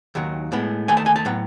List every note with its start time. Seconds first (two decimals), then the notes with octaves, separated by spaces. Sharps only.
0.15 D#2 D#3 F#3
0.52 A2 G#3 B3
0.88 D#2 D#3 A3 G#5
0.97 A5
1.06 G#5
1.16 A5
1.25 A2 F#3 B3